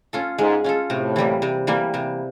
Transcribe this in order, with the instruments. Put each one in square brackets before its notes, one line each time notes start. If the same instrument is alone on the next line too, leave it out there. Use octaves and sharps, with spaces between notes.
[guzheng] C#4 F4 A4
[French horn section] G#2 [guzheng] G#3
[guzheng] C#4 F4 A4
[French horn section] A2 [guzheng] C3
[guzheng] E3 G3 A#3
C3
E3 G3 A#3
C3